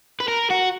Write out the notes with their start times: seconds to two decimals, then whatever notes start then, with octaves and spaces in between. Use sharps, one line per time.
0.20 B4
0.28 A#4
0.50 F#4